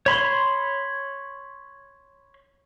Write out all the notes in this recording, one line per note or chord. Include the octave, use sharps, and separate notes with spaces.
C#5 B5 C6